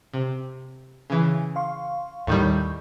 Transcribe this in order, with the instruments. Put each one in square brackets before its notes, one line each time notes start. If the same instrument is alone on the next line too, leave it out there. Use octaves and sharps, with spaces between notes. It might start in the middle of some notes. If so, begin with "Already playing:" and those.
[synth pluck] C3
C#3 E3
[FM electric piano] F5 C6 C#6
[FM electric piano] D#2 C#6 G6 [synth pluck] A2 D#3 G3